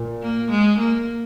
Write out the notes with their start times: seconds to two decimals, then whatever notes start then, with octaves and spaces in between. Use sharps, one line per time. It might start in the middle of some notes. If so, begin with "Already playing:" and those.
Already playing: A#2
0.23 A#3
0.51 G#3
0.79 A#3